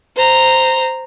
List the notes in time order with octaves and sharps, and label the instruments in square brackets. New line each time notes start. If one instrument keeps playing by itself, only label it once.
[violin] C5 A#5